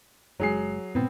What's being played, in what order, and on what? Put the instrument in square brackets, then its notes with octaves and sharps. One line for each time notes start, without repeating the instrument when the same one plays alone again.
[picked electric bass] F#1 G#3 [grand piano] F#3 G#4 C7
[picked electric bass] G#2 B2 [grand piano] B3 C4